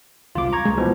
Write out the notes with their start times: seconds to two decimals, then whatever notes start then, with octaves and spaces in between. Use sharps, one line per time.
0.35 E1 C2 F4 D6
0.53 A#5 C#6 G#6
0.65 C#2 G#3
0.78 B2 E3 F3